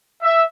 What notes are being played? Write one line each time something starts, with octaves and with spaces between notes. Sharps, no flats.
E5